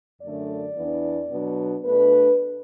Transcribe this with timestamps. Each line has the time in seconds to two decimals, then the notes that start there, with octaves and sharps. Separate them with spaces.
0.21 F#2 D3 A3 D4 D5
0.75 E2 E3 B3 D4
1.30 B2 F#3 B3 D4
1.85 B2 A3 D4 B4